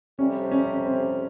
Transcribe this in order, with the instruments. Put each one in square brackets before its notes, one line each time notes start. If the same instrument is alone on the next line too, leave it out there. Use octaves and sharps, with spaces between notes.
[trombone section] F2 C3 G3 [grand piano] C#4
[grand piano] C#4
C4